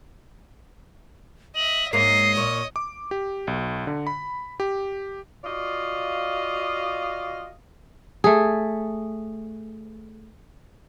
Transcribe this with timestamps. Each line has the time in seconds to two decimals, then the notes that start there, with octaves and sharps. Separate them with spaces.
1.56 D#5 E5 F#7
1.93 G#2 A#3 C#5 D#5 C7
2.37 A#2 C#6
2.76 D6
3.11 G4
3.47 B1
3.87 D3
4.07 B5
4.60 G4
5.44 F4 F#4 D5 D#5 F5
8.24 A3 G#4